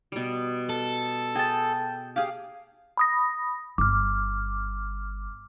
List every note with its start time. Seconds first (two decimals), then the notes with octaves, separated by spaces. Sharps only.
0.12 B2 G3
0.70 A4
1.35 G#4 G5 A5
2.16 G4 G#4 F5
2.97 B5 D#6 A#6
3.78 G1 D6 F6